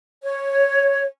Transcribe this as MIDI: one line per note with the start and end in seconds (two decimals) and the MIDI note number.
0.22 1.04 73